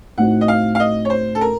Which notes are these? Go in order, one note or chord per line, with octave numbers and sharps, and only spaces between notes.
A2 A3 C4 D#4 F#4 F#5
D#5
F5
F5
D#5
C#5
C5
A4
A#4